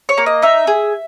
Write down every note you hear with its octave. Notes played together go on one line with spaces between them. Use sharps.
C#5
A#3
D#5
D#4 E5
G#4